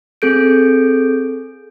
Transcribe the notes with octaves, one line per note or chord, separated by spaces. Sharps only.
C4 G#4 A4 G6 D7